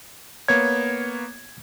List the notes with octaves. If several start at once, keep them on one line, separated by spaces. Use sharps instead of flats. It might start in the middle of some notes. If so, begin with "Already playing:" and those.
A#3 B3 C#5 G#6